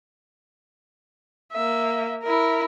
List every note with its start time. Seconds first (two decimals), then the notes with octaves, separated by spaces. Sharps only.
1.52 A#3 E5
2.23 E4 A#4